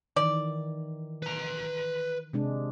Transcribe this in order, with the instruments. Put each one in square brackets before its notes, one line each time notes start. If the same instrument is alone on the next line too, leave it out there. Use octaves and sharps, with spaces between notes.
[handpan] D#3 E3 [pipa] D5
[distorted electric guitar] B4 A#5
[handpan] C3 G#3 D4